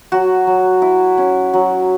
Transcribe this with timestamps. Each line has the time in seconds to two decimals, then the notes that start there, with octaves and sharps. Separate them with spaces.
0.12 F#3 F#4
0.47 F#3
0.82 E4
1.18 C#4
1.53 F#3